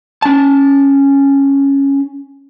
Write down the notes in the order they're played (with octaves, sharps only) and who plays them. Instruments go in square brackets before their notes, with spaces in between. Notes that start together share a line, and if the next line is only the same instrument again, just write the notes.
[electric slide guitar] C#4 A5